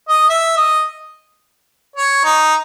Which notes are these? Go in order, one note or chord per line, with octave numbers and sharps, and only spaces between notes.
D#5
E5
D#5
C#5
D#4